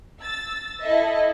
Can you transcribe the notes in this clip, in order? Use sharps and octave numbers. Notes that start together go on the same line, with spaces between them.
E6 A6
E4 A4 D#5 E5